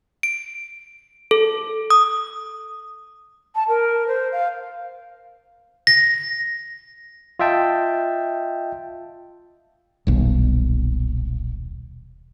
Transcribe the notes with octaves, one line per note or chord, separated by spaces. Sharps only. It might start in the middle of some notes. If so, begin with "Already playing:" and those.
D7
A4
D#6
A5
A#4
C5
F5
A#6
F4 D#5 E5 G5 A5
D#1 B1